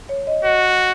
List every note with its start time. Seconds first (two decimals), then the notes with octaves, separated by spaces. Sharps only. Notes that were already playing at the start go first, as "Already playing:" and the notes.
0.09 C#5
0.27 D#5
0.45 F#4 D#5